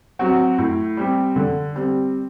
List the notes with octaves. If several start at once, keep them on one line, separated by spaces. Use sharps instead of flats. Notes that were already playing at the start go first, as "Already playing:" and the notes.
F#3 C4 F#4
A2
G3 C4 G4
D3
G3 C4